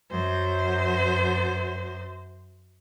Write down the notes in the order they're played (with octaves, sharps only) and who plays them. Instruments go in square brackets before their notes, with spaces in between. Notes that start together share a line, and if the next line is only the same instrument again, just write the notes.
[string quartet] F#2 C5